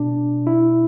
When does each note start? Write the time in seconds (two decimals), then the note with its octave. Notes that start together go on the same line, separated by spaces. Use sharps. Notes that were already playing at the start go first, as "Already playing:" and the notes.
Already playing: B2 D4
0.47 E4